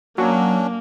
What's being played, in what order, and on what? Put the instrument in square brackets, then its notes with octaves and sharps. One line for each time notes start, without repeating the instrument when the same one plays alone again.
[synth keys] F#3 [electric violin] A#3 [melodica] C#4 D4